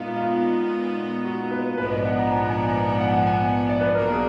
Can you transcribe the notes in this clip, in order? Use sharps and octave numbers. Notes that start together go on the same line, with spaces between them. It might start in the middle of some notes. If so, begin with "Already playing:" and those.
Already playing: A#2 G#3 B3 D#4 F4
F4
F#4
B4
A#1 G#2 F3 B3 D4 B4
D#5
F#5
A#5
G#5
A#5
G#5
A#5
G#5
F#5
G#5
G#5
D5
B4
B1 B2 A#3 D4 A#4
G#4